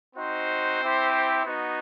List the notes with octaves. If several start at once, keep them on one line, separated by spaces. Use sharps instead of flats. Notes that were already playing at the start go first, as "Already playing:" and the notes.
C4 D#4 F#4 C5
C4 E4 G4
B3 D#4 F#4